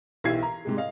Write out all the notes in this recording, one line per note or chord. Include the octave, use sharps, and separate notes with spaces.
B1 E3 E4 G4 G#6 C7
A#5
G#2 C3 G#3
D#5 F5